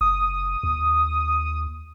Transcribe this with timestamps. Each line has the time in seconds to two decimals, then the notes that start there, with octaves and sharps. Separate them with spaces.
0.01 F#1 D#6
0.63 D#2